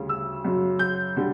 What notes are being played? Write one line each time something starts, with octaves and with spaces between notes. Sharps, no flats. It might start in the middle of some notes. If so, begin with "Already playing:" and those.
Already playing: D2 C#3 G3
E6
F#2 C#3 F#3
G6
D3 G3